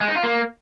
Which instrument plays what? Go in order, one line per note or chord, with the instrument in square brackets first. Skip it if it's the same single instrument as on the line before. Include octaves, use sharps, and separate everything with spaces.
[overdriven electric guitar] G#3
D#4
F4
A#3